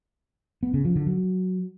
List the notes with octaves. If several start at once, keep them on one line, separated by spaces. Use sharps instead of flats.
B3
C#3
F3
D3
F#3